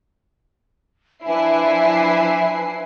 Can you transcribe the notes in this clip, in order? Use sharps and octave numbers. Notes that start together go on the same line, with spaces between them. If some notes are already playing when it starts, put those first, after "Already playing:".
F3 D4 E4 B4 G#5 C7